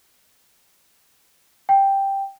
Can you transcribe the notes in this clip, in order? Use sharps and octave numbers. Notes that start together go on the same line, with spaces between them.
G5